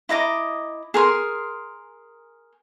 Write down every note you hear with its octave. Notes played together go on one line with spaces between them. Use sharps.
E4 D#5 A#5 D6
G#4 A#4 C6